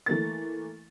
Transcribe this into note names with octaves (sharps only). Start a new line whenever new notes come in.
E3 A3 A#3 A6